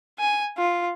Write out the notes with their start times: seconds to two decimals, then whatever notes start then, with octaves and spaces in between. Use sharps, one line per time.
0.19 G#5
0.57 F4